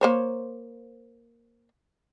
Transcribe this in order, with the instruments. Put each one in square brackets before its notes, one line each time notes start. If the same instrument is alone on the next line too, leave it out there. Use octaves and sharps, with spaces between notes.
[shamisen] A#3 C5 C#5